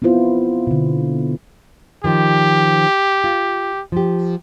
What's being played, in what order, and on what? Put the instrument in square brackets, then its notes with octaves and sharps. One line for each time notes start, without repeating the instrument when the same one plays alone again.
[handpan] B3 C4 E4 F4 C5
B2 D3
[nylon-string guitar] D#3 F3 [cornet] G4
[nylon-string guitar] F4
F3 G4